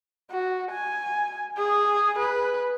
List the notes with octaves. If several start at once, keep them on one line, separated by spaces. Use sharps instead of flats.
F#4
G#5
G#4
B4